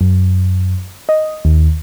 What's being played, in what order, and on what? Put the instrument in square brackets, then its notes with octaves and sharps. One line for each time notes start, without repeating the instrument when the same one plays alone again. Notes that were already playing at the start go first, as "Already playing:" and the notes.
[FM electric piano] F#2
D#5
D#2